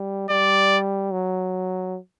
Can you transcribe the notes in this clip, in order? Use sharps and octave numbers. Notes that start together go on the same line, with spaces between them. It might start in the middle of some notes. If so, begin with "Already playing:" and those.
Already playing: G3
G3 D5
F#3